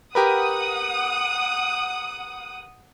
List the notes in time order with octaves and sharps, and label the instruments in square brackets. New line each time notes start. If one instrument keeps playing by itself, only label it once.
[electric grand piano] G4 A#4 B4 [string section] F#5 D#6